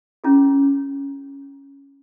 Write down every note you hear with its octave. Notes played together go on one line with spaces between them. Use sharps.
C#4 E4 G#4